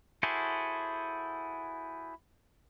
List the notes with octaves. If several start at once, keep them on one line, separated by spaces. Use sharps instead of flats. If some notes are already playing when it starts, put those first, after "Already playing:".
E4 F#4 G#4 A4 C5